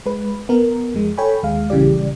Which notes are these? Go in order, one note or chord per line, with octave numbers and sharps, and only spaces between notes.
G#3 B4
B3 A#4
F2 G#3
A4 C#5 G5 G#5 B5
D#2 G#3 F5
A#1 C#3 E3 G3 G4 D5